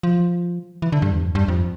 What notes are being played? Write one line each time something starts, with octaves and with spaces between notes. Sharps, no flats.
F3
E3
D3
G2
E2
F2
G2
F2